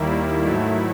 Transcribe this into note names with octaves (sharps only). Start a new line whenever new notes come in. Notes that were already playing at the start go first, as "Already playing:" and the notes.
Already playing: D#2 D#3 G3 A#3 E4
G#2 D#3 F#3 A3